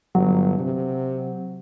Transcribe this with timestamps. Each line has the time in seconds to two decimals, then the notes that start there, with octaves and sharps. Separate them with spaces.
0.15 G1 F#3
0.59 C3